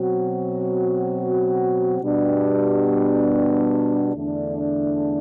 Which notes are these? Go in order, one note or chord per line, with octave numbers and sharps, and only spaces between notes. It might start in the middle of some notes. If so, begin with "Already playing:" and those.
Already playing: B2 F#3 C4 F#4
B2 G3 B3 D4 G4
E2 D3 A3 D4